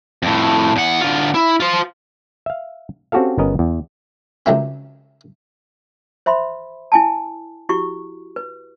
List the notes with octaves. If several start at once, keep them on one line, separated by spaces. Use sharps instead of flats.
F2 A2
E2 F#5
D3 F4
E4
F4 C5
E5 F5
C4 C#4 F#4 G4 A4 F5
G1 B3 C#4 A#4 D#5
E2
C#2 D#3 F#3 A3 C4
C5 E5 B5 C6
E4 G#5 A5
E4 F#4 G4 C#6
B4